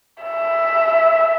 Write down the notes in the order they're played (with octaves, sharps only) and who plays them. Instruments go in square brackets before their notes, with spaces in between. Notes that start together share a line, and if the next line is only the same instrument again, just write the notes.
[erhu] E5